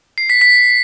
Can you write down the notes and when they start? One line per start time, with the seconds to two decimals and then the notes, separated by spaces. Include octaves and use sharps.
0.18 C7
0.30 B6
0.41 B6